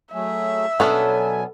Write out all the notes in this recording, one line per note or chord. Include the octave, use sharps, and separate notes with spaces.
F#3 A3 G#4 E5
B2 F#3 B3 C#4 D4 A4 G#5